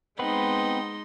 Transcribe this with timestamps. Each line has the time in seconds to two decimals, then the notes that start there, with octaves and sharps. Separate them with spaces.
0.19 G#3 B3 C4 D#4 B4 C6